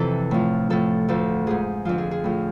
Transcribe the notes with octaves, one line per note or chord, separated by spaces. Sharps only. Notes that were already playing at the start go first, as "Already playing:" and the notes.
Already playing: F2 C3 E3 A4
A2 F3
A2 F3 A4
D2 D3 F3
G#2 F3 G#4
F2 D3 F3 F4
G#4
G#4
A2 F3